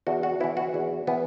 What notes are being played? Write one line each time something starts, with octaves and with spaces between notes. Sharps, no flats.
E2 F#4
F#4
E3 B3 E4
F#4
E2
E3 B3